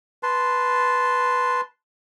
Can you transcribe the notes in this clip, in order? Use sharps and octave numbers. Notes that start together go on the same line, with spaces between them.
B4 A5 C6